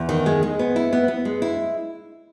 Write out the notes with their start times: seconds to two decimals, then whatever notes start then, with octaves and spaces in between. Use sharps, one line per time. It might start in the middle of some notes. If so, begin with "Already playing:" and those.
Already playing: E2
0.09 D#3
0.26 G#3
0.43 G#3
0.59 B3
0.76 E4
0.93 B3
1.08 B3
1.25 G#3
1.42 E4